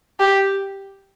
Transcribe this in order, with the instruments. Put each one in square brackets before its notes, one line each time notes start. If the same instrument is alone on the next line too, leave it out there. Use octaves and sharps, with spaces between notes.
[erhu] G4